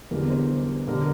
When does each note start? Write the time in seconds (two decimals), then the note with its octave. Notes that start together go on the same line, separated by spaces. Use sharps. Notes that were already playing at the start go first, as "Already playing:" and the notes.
0.11 E2 D3 G3 A#4
0.30 C5
0.88 D3 G3 A#4